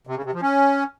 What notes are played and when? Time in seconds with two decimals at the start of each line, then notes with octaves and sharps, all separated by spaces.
0.07 C3
0.16 C#3
0.25 C3
0.33 F3
0.42 C#4